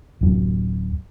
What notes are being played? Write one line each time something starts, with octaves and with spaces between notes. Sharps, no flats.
D1 F#2